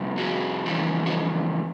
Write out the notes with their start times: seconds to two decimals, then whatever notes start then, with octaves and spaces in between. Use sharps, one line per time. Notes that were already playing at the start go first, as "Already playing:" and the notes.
Already playing: F2 C3 G3
0.18 F#4 G#4
0.66 F2 C#3 E3 G3
1.06 F#4